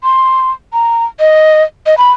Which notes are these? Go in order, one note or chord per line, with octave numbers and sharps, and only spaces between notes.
C6
A#5
D#5
D#5
B5